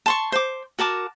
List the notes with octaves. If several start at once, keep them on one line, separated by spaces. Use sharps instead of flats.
A5 C6 C#6
C5 D6
F#4 A#4 A5 D6